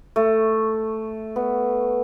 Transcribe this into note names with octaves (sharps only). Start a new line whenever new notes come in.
A3
B3